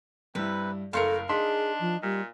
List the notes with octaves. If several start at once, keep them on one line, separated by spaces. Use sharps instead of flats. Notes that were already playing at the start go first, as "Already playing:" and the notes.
G2 C3 G3 E4 B4
F#1 A2 A4 A#4 E5 F5 C6 C#7
D4 D#4 G#4 C6 B6
F3
A#2 G3